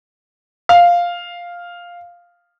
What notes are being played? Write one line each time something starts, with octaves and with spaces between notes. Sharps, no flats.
F5